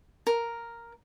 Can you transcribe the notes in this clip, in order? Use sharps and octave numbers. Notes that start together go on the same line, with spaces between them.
A#4